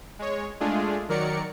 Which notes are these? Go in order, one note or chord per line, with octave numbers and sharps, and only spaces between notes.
G#3 C#5
G#3 A3 D4 F4 G#4
D#3 F#3 A#4 D5 C#7